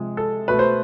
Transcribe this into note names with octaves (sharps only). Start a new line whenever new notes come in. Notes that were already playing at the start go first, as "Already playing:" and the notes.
Already playing: C3 F3 G#3
A4
B2 A3 B4
C5